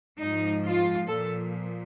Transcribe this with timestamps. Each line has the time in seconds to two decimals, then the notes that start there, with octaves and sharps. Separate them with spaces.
0.20 G#2 F3 D#4
0.64 F4
1.07 A#2 F3 A4